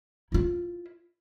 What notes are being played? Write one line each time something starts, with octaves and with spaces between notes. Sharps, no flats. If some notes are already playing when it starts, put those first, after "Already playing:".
E4 F4